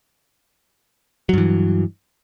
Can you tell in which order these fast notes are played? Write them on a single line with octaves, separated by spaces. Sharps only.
F#3 G2 E3